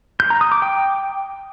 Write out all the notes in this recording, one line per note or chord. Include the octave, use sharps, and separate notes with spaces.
G6
A#5
D#6
D6
G5